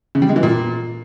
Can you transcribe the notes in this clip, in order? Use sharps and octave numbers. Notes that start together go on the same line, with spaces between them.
C#3
G3
G#3
E3
A#2